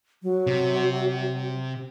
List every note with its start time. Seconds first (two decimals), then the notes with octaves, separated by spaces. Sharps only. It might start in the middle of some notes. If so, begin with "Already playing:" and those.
0.23 F#3
0.47 C3